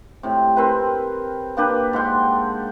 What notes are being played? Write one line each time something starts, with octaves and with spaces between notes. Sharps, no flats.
A2 C3
C4 A#4 B4
A#3 D4 G4 B4
G#2 F#5 G5 C6